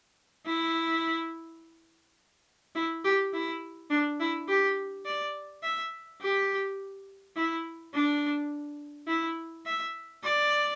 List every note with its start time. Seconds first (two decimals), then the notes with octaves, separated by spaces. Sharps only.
0.46 E4
2.75 E4
3.04 G4
3.33 E4
3.90 D4
4.20 E4
4.48 G4
5.06 D5
5.63 E5
6.22 G4
7.37 E4
7.94 D4
9.08 E4
9.66 E5
10.24 D5